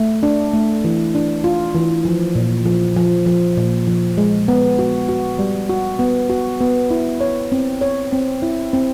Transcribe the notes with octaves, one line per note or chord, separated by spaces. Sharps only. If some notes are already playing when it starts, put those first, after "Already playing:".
Already playing: A3
D4
A3
E3
D4
F4
E3
F3
A#2
F3
F3
F3
A#2
F3
G#3
B3
F#4
F#4
G3
F#4
B3
F#4
B3
E4
C#5
C4
C#5
C4
E4
C4